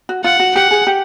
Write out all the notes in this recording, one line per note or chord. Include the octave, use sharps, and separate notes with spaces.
F#4
F4 F#5
F#4
G4 F#5
G#4
G4